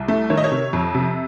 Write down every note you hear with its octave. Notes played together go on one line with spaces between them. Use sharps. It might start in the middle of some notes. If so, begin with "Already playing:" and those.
Already playing: C2
A3
D#3 C#5
D#5
C#5
C3
F2
C3